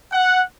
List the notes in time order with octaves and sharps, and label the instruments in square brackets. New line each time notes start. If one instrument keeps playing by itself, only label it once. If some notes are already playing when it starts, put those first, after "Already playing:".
[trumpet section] F#5